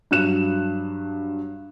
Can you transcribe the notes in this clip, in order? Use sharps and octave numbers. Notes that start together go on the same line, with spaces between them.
G2 F#3 D4 F#6 E7